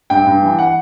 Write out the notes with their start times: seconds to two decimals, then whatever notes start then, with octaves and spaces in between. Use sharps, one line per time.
0.10 G2 G5
0.26 G2
0.42 E3
0.59 F#5